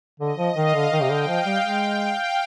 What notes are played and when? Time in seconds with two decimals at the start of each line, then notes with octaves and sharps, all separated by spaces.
0.20 D3 D#5
0.38 F3
0.55 D#3 F5
0.74 D3
0.92 D#3 G5
1.02 C3
1.10 D3
1.27 F3 F5
1.45 G3
1.63 G#3 G5
1.99 F5